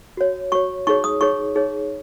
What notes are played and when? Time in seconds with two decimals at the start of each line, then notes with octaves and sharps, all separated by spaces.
0.17 F#4 C#5
0.52 F#4 C#5 C#6
0.87 D#4 G#4 C#5 C#6
1.04 D#6
1.21 D#4 G#4 C#5 C#6
1.56 D#4 G#4 C#5